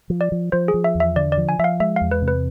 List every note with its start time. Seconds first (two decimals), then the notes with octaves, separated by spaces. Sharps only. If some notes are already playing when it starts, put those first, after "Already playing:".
0.10 F3
0.21 D5
0.32 F3
0.52 F3 C5
0.68 G#4
0.74 F3
0.84 E5
0.95 E2
1.00 E5
1.16 D3 D5
1.32 D5
1.38 F3
1.49 G#5
1.59 F3 E5
1.64 F5
1.80 G#3 E5
1.96 E2 F5
2.11 B4
2.22 C3
2.28 B4